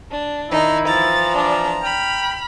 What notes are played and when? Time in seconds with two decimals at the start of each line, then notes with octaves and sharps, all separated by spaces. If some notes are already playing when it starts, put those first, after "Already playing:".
0.12 D4
0.50 D#3 D#4 E4
0.88 E3 F3 A#5 A6
1.36 D4 D5
1.82 G5 B5 F6